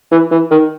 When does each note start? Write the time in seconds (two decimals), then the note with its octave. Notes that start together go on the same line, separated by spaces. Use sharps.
0.12 E3
0.31 E3
0.51 D#3